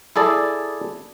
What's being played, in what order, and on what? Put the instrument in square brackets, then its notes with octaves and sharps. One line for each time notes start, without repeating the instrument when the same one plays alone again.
[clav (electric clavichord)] E4 G#4 A4 D5